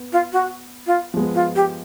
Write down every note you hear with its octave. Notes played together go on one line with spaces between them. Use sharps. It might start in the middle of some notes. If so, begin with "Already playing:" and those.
Already playing: B3
F4
F#4
F4
F3 G#3 B3
F4
G4